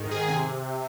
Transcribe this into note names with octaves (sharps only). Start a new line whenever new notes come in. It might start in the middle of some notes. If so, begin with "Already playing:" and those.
Already playing: G#2 D#3
D#3 G#4
C3 G#4